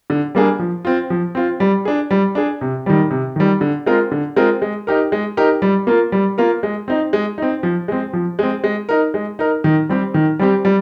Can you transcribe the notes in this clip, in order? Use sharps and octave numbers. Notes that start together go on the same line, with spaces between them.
D3
G3 A#3 D4 G#4
F3
C4 F4
F3
C4 F4
G3
D4 G#4
G3
D4 G#4
C3
D#3 G3
C3
D#3 G3
D3
G#3 C4 F4 A#4
D3
G#3 C4 F4 A#4
G#3
D#4 G4 A#4
G#3
D#4 G4 A#4
G3
A#3 F4 A#4
G3
A#3 F4 A#4
G#3
C4 D#4
G#3
C4 D#4
F3
G#3 C4
F3
G#3 C4
G#3
D#4 A#4
G#3
D#4 A#4
D#3
G3 C4 G4
D#3
G3 C4 G4
G3